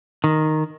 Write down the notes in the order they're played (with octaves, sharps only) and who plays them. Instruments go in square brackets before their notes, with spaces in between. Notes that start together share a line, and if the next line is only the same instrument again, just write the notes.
[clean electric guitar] D#3